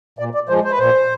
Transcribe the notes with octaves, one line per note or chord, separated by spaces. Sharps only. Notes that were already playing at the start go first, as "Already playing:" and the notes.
A#2 D5
D5
F3 G#3 C5
C5
B4
A#2 C5